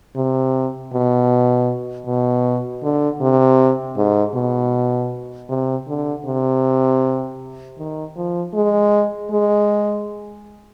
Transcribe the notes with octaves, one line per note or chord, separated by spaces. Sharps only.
C3
B2
B2
D3
C3
G#2
B2
C3
D3
C3
D#3
F3
G#3
G#3